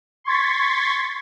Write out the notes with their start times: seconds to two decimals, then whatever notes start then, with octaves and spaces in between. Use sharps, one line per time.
0.24 C6 C#6 G#6 A6 B6